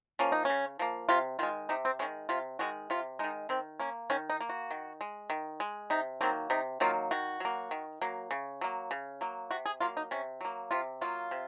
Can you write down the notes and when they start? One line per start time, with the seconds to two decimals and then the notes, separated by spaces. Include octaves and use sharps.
0.19 F3 A#3 C#4
0.32 D#4
0.45 C#3 C#4
0.79 F3 A#3
1.09 C3 F4
1.39 D#3 G#3 F4
1.69 C3 D#4
1.85 C4
1.99 D#3 G#3 C#4
2.29 C3 F4
2.59 D#3 G#3 F#4
2.90 C3 F4
3.19 G#3 D#4
3.24 D#3
3.49 D#3 C4
3.80 A#3 C#4
4.10 D#3 C#4
4.30 D#4
4.41 A#3
4.49 F#4
4.71 D#3
5.01 G#3
5.30 D#3
5.60 G#3
5.90 C3 D#4
6.21 D#3 F#3 A#3 C4
6.50 C3 D#4
6.80 D#3 F#3 A#3 F4
7.11 D#3 F#4
7.40 F#3 A#3
7.71 D#3
8.01 F#3 A#3
8.31 C#3
8.61 F#3 A#3
8.91 C#3
9.21 F#3 A#3
9.51 C3 F#4
9.66 G#4
9.80 F#3 A#3 F4
9.97 D#4
10.11 C3 C#4
10.41 F#3 A#3
10.71 C3 F4
11.01 F#3 A#3 F4
11.31 C3